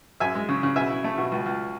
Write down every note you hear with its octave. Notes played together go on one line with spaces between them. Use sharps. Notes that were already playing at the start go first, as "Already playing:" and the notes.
F#2 E5 G#5
G#3
C#3
C#3
B2 E5 G#5
E4
A3
B2
C#2
C#2